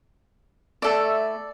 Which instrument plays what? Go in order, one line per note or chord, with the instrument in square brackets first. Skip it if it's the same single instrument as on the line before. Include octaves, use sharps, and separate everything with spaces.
[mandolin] A3 E4 [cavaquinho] A4 D5